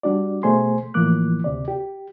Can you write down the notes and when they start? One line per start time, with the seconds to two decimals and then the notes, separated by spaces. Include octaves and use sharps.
0.03 G3 D4 F#4 D5
0.43 B2 A3 G#4 C5 G#5 C6
0.94 A2 E3 F3 A#3 D6 F#6
1.44 D2 C3 D5
1.68 G4